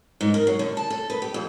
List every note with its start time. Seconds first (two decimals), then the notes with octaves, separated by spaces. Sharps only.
0.21 G#2
0.34 A#4
0.47 F#3
0.59 D3
0.77 A5
0.90 A4
1.10 B4
1.22 G4
1.34 F2